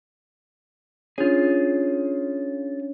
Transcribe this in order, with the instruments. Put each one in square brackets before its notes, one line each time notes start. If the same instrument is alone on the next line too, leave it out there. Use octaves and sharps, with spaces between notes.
[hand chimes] C#4 D4 C#5 [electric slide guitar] F4 G#4